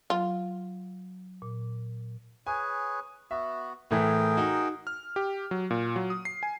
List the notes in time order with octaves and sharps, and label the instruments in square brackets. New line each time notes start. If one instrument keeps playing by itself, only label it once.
[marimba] F#3 [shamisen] F4
[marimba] A#2
[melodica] G#4 B4 C#5 [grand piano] G#5
[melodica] B3 F#4 [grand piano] E5
[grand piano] A2 E3 A3 [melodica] G#4 A#4 G5
[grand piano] D#4 F#4
[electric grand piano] F6
G4
F#3
A#2
F#3
D#6
C7
G#5